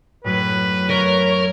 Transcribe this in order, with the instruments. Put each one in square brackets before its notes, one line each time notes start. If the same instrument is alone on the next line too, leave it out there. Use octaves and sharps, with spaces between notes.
[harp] F#2 A2 [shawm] B4
[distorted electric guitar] A#4 [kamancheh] C#5